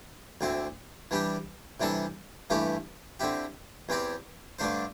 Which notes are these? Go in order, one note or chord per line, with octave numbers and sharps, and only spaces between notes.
D2 D3 C4 E4
E3 G3 D4 G4
C3 E3 G3 D4 A4
G2 E3 A3 E4 G4
D3 C4 E4 G4
E2 E3 C4 G4 D5
G2 D3 A3 D4 C5